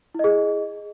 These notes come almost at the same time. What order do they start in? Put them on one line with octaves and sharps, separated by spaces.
E4 D#5 G#4